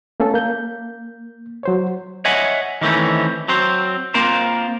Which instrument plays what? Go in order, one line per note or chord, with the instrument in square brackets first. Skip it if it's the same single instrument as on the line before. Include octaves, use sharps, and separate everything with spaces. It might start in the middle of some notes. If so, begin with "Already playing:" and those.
[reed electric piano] A3 A#3 C#4 A4
A#3 G6
F#3 C5 C#5
[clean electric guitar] C#5 D#5 E5 F#5 G#5
D#3 E3 A3 C4 C#4
F#3 C4 C5
A#3 C4 F4 A#4 C5